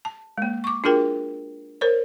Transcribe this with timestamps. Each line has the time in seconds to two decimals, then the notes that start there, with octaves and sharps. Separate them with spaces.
0.05 A5
0.38 G#3 A#3
0.64 C#6 D6
0.84 D4 F4 F#4 G#4 A#4 G5
1.81 A#4 C5 C#5